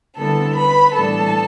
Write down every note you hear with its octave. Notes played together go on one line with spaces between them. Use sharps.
D3 G3 B3 E4 A4 A5
B4 B5
A2 E3 G3 B3 D4 A4 A5